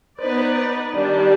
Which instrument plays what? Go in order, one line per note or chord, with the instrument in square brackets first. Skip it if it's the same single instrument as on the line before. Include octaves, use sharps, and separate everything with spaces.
[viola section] B3 D#4 B4 D5 [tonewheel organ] C5
[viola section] D#3 G3 D4 G4 [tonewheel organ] D5